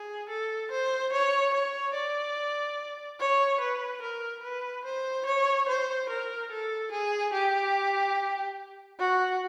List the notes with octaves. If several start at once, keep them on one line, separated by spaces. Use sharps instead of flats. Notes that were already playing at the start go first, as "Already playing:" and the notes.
Already playing: G#4
A4
C5
C#5
C#5
D5
C#5
B4
A#4
B4
C5
C#5
C5
A#4
A4
G#4
G4
F#4